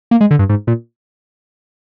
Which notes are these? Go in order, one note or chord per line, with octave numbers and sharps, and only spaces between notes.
A#3
G#3
D3
G2
G#2
A#2